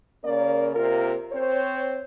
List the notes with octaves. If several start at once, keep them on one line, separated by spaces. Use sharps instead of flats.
C#3 A#3 C#4 A#4 D5
C3 A#3 F4 A#4
C4 C5 C#5